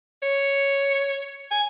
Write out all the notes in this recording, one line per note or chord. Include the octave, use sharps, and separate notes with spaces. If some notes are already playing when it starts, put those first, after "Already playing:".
C#5
G#5